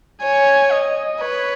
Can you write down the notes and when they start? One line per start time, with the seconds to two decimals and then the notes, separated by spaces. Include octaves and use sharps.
0.22 C#5 G#5
0.72 D#5
1.21 B4 C#5